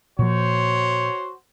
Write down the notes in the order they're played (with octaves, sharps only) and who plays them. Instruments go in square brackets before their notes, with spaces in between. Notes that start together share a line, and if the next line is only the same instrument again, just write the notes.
[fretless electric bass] A#2 F3 [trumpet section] F#4 C5 C#5